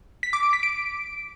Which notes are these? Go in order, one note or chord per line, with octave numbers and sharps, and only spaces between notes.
B6
D6
D7
B6
D7